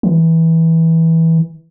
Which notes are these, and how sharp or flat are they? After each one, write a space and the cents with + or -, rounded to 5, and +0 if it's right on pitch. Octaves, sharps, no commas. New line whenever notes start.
E3 -15